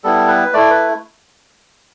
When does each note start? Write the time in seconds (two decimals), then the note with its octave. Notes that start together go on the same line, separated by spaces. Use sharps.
0.04 G3 B3 E4 A4
0.28 B4
0.53 A3 E4 D5
0.70 B4